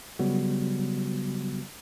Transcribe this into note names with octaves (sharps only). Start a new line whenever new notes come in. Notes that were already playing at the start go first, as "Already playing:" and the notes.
C#3 F#3 G3 B3 F#4